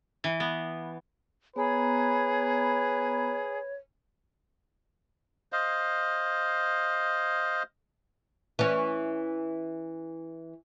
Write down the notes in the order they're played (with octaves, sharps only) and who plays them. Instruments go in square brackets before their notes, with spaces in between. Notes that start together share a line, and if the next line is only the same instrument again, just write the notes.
[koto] E3
B3
[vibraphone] B3 A#5 B5 [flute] G#4 [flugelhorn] B4 [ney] C#5
[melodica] C5 D#5 F5
[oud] E3 C#4